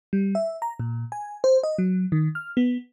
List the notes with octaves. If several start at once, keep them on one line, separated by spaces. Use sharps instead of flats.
G3
E5
A#5
A#2
G#5
C5
D#5
F#3
D#3
F6
B3